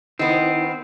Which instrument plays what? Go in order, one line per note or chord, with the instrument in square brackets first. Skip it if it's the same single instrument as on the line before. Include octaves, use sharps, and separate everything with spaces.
[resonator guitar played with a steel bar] D#3 B3 [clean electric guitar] C4 [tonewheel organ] D#4 E4 C5